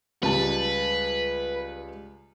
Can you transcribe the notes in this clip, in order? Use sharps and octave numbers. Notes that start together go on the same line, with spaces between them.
C#2 G3 B4 A5